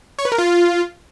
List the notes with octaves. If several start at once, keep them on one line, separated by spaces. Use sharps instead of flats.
C#5
B4
A#4
F4